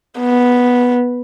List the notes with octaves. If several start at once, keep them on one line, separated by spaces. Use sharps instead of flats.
B3